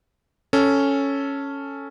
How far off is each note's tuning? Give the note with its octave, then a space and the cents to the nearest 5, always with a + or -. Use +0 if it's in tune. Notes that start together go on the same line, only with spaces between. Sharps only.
C#4 +0 A4 +0